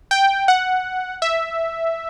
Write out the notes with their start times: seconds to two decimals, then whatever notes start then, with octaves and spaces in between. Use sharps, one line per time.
0.11 G5
0.48 F#5
1.22 E5